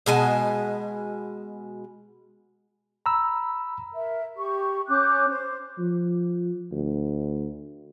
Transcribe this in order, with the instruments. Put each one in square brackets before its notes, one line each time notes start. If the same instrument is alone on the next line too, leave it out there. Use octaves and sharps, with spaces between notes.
[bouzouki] B2 G#3 G#5 A5
[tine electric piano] A#5 B5 E6
[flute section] A#4 E5
G4 C#6
C#4 D6 F#6 G6
C5
[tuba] F3
D2